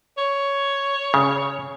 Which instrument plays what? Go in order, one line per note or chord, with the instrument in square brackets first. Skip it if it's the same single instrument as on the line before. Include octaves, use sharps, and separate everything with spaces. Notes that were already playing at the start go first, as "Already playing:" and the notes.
[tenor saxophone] C#5
[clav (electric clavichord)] C#3